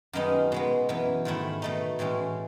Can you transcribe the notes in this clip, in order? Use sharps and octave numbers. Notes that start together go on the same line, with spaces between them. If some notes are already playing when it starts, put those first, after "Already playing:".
F#2 D#3 G#3 B3 D#4
B2 G#3 B3
F#2 E3 B3
G#2 D#3 A3 E4
B2 A3 D#4
A2 E3 G#3 C#4